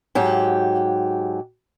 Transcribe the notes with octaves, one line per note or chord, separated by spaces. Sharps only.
G#2 F#3 G4